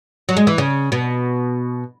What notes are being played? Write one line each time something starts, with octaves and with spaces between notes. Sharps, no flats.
F#3
G#3
E3
C#3
B2